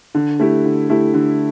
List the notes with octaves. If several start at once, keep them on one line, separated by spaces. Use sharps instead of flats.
D3
A3 E4 G4
D3
A3 E4 G4
D3